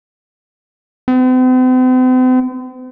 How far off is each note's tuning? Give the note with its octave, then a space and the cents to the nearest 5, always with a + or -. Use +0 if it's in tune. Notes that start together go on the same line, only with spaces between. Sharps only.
C4 -45